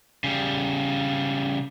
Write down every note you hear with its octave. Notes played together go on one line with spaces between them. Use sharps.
C#3 G3